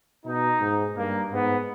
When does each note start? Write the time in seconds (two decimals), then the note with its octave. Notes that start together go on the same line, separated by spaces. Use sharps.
0.25 B2 D#4
0.60 G#2
0.97 G2 A#3
1.32 G#2 B3